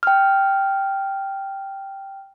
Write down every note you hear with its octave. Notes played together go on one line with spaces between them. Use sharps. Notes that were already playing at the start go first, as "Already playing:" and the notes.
G5 F6